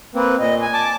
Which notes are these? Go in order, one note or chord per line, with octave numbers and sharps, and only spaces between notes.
A#3 C4 B4
A#2 D#5
G#5
A5 D6